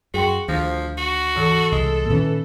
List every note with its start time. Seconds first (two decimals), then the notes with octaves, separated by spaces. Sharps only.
0.14 F#2 F#4 G#4 G5 C6
0.48 D2 D#3 F3 C5 A#6
0.98 F#4
1.36 G#2 E3 A4
1.72 C2 G#3
2.10 A#2 D#3 E3 C#4